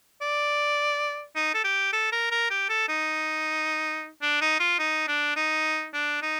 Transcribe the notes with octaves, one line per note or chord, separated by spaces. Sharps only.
D5
D#4
A4
G4
A4
A#4
A#4
G4
A4
D#4
D4
D#4
F4
D#4
D4
D#4
D4
D#4